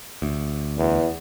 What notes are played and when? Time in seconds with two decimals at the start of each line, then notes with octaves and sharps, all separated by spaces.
0.22 D2
0.77 E2